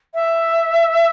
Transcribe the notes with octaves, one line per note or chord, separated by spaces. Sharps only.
E5